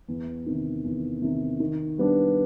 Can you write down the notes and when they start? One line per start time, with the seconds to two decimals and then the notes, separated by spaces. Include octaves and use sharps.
0.08 E2
0.46 C3 D#3
0.84 E2
1.22 C3 D#3
1.60 D#3
1.98 G3 B3 D4